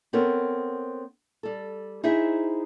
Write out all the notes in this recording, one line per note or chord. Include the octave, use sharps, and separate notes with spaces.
B3 C4 A4 A#4 C#5
G3 A4
D#4 E4 G#4 C5 E5